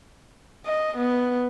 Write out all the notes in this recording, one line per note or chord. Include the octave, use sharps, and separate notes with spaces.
D#5
B3